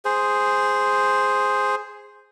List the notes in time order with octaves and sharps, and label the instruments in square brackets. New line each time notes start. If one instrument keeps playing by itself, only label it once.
[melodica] G#4 C5